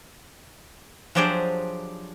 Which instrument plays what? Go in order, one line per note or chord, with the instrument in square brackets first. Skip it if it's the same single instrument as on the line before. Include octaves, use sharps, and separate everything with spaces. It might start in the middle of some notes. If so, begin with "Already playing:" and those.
[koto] F3 F#3 D4 G4 G#4 C5